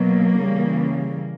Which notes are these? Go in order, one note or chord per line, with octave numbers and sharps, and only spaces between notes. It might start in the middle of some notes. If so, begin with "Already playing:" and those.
Already playing: B2 F#3 A#3
C#3 E3 G3